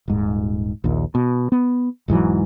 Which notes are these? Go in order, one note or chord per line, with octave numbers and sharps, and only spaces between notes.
D#1 G#2
A#1 D#2
B2
B3
E1 G#2 E3 F#3